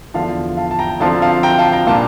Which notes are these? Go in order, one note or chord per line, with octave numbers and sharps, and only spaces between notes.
E2 D3 F3 F5 A5
F5 A5
A5
G5 A#5
D3 F3 C4 F5 A5
F5 A5
G5 A#5
F5 A5
G5 A#5
A#2 G3 D4 F5 A5